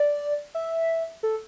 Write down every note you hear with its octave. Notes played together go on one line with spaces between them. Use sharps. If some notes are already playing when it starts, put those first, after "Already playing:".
Already playing: D5
E5
A4